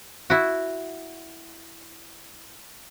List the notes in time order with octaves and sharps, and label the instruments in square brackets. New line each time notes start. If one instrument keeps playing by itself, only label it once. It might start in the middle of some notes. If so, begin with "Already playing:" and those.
[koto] E4 F#4